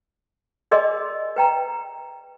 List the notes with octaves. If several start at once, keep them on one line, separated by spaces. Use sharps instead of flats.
G#4 A#4 D5 D#5 G#5 C6
B4 G5 A#5